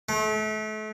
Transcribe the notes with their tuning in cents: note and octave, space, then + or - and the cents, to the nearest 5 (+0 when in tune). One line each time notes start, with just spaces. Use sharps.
A3 -35